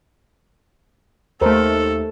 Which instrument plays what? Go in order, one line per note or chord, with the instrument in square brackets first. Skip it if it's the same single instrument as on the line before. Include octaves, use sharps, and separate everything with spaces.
[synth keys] D#2 A3 [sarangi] A4 [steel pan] A#4 C5